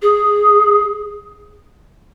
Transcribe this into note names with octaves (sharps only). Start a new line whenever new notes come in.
G#4